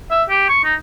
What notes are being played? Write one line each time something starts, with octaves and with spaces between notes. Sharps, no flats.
E5
G4
C#6
D#4